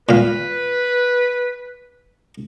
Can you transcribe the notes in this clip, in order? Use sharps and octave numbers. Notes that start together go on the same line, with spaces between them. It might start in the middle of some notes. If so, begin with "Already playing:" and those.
A#2 B4 F5